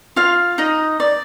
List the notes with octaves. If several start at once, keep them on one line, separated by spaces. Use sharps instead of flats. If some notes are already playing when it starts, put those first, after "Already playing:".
F4 F5
D#4 D#5
D5